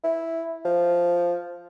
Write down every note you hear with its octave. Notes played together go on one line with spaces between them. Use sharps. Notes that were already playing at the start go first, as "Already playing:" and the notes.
E4
F3